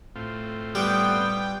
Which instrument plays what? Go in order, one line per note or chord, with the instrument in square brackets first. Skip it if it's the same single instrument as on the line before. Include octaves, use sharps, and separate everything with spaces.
[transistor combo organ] A2 C4 F4
[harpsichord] G3 [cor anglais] B3 [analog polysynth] G5